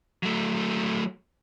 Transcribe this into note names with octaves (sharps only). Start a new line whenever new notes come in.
F#3 A3